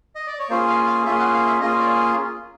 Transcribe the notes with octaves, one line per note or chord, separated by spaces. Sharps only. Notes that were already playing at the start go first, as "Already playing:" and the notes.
D#5
D5
C#5
A#3 C#4 F4 G#4 C5
F5
F5
A#3 C#4 F4 G#4 E5
F#5
F5
E5
A#3 C#4 F4 G#4 D#5
D5